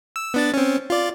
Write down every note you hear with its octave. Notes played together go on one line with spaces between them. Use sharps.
E6
B3 D4 A6
C4 C#4
F4 D5